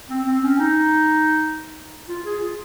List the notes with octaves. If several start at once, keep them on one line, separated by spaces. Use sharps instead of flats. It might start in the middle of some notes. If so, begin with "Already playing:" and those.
C4
C4
C#4
D#4
F4
G#4
F4